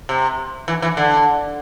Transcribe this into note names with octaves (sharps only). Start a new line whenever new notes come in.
C3
E3
E3
D3